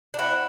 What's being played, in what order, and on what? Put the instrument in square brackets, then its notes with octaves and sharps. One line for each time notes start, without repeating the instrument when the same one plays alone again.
[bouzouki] D4
[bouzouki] C4 E4 [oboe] F#5